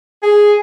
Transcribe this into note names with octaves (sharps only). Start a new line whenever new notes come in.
G#4